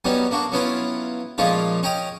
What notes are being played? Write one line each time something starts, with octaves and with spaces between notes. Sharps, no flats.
F#3 G3 B3 C#4 D#4
A#3 D4 F#4
F#3 B3 C#4 E4 F4
A#2 F3 G#3 C#4 D#4 F4
C#4 D#5 G5 A#5 D#6